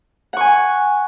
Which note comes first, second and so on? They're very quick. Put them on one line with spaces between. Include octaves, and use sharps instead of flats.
F#5 C#6 G#5